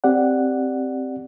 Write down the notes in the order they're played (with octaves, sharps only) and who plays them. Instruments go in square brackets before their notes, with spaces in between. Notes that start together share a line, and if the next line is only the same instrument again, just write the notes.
[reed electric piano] C4 G4 D5 F#5